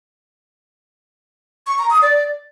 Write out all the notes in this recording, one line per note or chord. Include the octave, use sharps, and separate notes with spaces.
C#6
A#5
D#6
D5